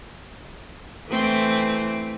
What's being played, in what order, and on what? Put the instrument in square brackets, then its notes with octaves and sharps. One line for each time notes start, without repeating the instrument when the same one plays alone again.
[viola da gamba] E3 A3 C4